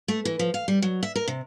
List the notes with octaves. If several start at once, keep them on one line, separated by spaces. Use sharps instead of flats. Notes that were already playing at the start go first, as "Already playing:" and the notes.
A3
E3
F3
F5
G3
F#3
E5
A#4
C3